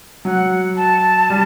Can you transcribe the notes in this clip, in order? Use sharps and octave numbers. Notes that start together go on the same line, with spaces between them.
F#3 F#5
A5
G3